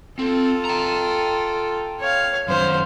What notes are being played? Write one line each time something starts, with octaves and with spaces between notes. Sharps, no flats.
C4 F4 A4
G5 A#5
C#5 F5
F#2 D#3 C5 F5